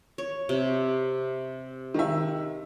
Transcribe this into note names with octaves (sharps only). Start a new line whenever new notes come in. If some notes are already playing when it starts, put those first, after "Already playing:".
C#5
C3
D#3 E5